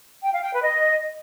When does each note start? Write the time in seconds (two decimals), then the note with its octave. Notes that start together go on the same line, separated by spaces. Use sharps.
0.23 G5
0.33 F5
0.42 G5
0.52 B4
0.62 D#5